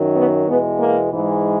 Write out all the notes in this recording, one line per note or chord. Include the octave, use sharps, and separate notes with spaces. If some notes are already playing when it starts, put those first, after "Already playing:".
Already playing: F#2 D#3 F#3
B3
E2 B2 G#3 B3
A#3
G#2 E3 G#3